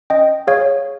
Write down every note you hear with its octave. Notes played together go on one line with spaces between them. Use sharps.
C#4 D#5 G5
G#4 C#5 F5